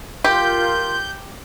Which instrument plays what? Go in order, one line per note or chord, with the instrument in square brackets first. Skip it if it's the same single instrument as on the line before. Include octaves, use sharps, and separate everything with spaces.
[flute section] F4 A#4 C6 [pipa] G4 [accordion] G6